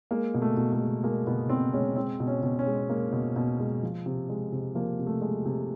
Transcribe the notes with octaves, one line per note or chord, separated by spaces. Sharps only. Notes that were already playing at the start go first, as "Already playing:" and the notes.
G#3 A#3
B2
A3
B2
A3
G#3
G#3 A#3
B2 B3
B2 C4
G#3 C#4
G#3 C4
B2
C#4
B2
C#4
G#3
G#3 A#3
B2
B2
G#3
F3
C3
G#3
C3
F3 A#3
C3
A3
G#3
C3